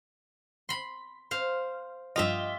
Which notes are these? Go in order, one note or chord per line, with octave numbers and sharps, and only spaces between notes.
B5 C6
C5 F5
G2 F3 F4 G4 D#5 E5